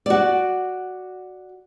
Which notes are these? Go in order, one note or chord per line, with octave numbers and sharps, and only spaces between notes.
F#4 D5